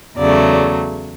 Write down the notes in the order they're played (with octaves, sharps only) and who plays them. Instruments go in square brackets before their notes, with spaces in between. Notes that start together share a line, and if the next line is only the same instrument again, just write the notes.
[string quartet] E2 C#3 F#3 A3 D5